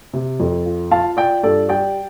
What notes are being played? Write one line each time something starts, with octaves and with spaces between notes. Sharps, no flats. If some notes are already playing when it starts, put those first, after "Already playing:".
C3
F2
F4
F4 F5 A5
F4 D5 G5
G2 A4 D5
G3 D5 G5